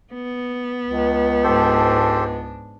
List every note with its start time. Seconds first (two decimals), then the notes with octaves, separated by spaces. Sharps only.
0.13 B3
0.85 C#2
1.44 G#2 D4 G4 A4 C5